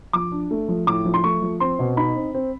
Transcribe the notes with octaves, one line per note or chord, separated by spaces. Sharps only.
F3 D6
D4
A3
F3
A2 D6
F3
C6
A3 C#6
F3
C4 C6
B2
D#4 B5
C4
C4